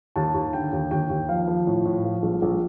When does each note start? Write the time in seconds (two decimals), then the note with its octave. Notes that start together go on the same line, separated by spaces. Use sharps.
0.16 D#2 A5
0.35 D#2
0.53 D3 G5
0.72 D#2
0.91 D#2 G5
1.10 D#2
1.29 F3 F5
1.48 F3
1.67 A2
1.85 A2
2.04 F3
2.23 A#1
2.42 A#1